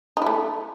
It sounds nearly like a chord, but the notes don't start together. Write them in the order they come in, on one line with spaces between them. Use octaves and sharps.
D#4 E4 A3